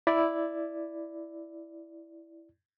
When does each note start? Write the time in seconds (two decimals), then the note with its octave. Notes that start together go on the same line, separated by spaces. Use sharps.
0.07 E4 D5